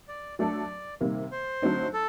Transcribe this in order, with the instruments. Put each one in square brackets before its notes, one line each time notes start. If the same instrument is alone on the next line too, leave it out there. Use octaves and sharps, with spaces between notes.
[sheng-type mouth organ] D5
[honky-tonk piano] F#3 A3 D4 A4 [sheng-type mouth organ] D5
[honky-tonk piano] C3 D#3 G3 A#3
[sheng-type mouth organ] C5
[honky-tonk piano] D3 F#3 A3 C4 D#4
[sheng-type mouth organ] A4